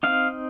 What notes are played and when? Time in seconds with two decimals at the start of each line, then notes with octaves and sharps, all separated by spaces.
0.03 C4 D#4 F5